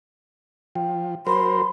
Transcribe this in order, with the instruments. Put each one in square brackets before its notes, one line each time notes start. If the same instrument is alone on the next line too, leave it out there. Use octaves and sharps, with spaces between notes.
[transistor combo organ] F3 [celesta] G5
[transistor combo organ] F#3 A#4 C5 [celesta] B5 [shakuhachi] C6